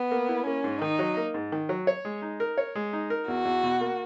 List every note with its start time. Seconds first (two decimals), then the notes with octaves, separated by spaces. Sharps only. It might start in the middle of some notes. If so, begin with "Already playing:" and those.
Already playing: B3
0.11 A#3
0.29 E4
0.46 A#3 C#4
0.64 G#2
0.82 D#3 D#4
0.99 F#3
1.17 A#3
1.34 G#2
1.52 D#3
1.69 F#3
1.87 C#5
2.05 G#3
2.22 D#4
2.40 A#4
2.58 C#5
2.75 G#3
2.93 D#4
3.10 A#4
3.28 E2 F#4
3.45 E2
3.63 B2
3.81 A#3